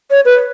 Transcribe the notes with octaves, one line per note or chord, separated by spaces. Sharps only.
C#5
B4